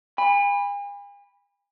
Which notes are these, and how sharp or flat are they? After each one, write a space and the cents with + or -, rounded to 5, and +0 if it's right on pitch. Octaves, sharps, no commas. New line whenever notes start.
G#5 -45 B5 +0